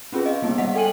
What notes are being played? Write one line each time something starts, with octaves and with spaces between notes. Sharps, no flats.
C4 C#4 F4 G#4 B4
D#5 F5
G3 A#3 B3 D#4
G3 G#3 D#5 E5 F#5 B6
A4 G5 G#5 D#7 F#7